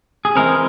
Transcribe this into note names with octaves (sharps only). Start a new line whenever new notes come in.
G#4
E3 G#3 C4 A#4